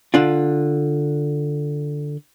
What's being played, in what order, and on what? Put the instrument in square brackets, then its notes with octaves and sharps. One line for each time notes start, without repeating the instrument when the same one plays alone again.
[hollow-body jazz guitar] D3 D4 F4